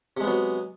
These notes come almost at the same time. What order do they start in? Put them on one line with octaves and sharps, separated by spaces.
C3 G#3 B3 F#3